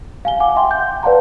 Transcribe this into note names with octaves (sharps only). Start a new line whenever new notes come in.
F5 G#5 G7
F#5 G#5 D6
E5 G5 C6
G6
B4 D5 F5 F#5 A5 A#5